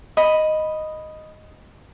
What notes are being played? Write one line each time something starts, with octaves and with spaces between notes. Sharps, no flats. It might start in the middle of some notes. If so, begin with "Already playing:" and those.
D#5 B5